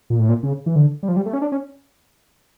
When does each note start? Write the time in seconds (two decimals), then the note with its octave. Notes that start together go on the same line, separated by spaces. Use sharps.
0.10 A#2
0.19 A2
0.29 A#2
0.43 C#3
0.66 E3
0.76 D3
1.03 G3
1.08 F3
1.16 G3
1.26 A3
1.33 C#4
1.42 D4
1.52 C#4